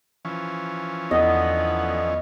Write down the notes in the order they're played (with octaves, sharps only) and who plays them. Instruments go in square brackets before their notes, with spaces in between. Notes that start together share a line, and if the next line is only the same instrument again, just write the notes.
[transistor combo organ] E3 F3 C#4
[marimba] E2 [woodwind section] D3 B3 [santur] D#5